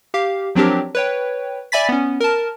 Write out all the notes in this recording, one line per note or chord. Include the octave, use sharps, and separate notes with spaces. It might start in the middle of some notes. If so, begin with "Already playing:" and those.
G4 F5
F3 F#3 C4 D4 G4 A#4
B4 C#5 G5
D5 E5 G#5 B5 A6 B6
B3 C#4
A#4 A5